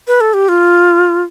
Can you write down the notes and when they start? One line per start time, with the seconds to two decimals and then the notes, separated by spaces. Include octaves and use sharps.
0.07 B4
0.21 A4
0.34 G4
0.48 F4